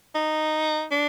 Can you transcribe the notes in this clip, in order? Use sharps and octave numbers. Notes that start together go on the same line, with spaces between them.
D#4
D4